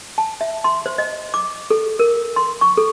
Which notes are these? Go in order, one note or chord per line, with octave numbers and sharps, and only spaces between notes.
A5
E5
C6
C5
D#5
D6
A4
A#4
C6
C#6
A4